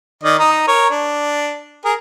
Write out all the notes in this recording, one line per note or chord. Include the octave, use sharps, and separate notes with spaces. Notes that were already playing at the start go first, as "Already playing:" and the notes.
D#3 D5 D#5
D#4 D#5
A#4 C#5
D4
G#4 A#4